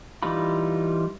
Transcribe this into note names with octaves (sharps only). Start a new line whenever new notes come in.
E3 G3 D#4 F4 B5